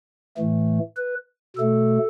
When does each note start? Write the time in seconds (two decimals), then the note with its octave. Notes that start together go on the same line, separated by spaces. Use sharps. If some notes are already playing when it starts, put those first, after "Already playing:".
0.37 A2 E3 A3
0.97 B4
1.57 B2 A3 A4